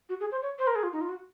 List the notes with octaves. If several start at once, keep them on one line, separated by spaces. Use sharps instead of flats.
F#4
G#4
C5
C#5
C5
A#4
G#4
F4
D#4
F4
F#4